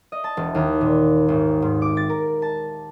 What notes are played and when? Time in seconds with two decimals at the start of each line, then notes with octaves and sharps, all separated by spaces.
0.12 D#5
0.24 A5
0.37 E1
0.55 D#2
0.81 A#2
1.28 G#1
1.62 G#2
1.82 D6
1.97 A6
2.09 A#4
2.42 A5